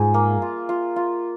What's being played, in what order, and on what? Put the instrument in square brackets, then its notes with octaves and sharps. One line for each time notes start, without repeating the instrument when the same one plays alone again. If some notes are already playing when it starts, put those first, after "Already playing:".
Already playing: [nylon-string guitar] G#2 [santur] F4 G#4
[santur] A#3
F4
F4
F4